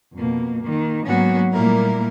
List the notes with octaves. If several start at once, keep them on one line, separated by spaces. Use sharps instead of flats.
F2 B2 A#3
D#3 A#3
G#2 F#3 A#3 B3 C#4 F#4
A#2 G3 A3 A#3 E4 A#4